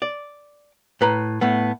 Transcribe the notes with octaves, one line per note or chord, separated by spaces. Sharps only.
D5
A2 B4 A#5
A2 A3 B3